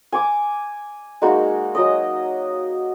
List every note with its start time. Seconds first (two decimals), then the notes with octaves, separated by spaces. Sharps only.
0.12 G#5 D6
1.22 G#3 A#3 D#4 F#4
1.75 F#3 D#5